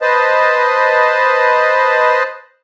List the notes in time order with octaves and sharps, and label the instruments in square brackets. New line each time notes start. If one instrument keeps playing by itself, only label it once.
[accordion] B4 C5 D#5 A5